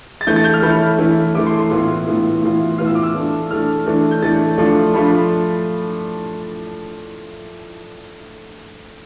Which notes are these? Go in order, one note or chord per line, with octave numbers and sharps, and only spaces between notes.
A6
E3 A3 E4 G6
A6
G6
F6
E3 A3 E4 B5
E3 A3 E4
E3 A3 E4 D6
C6
C6
A2 E3 B3 F4
A2 E3 B3 F4
A2 E3 B3 F4
A2 E3 B3 F4 F6
E6
D6
E6
E3 A3 D4
E3 A3 D4 F6
E3 A3 D4
G6
E3 A3 D4 A6
F3 A3 D4 F4
F3 A3 D4 F4 B5